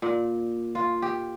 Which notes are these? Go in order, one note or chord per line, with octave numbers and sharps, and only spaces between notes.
A#2
F4
G4